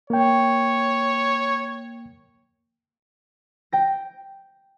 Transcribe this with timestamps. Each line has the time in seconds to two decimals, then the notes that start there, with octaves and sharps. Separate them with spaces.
0.10 A#3 C#5 G5
3.73 G5 A#6